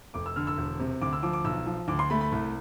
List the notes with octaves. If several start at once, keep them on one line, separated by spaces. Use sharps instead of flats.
F1 D6
E6
D3 F6
E6
E1
C3
D2 D6
E6
F3 D6
D6
B1 E6
F3
D2 D6
C6
A3 B5
B5
C2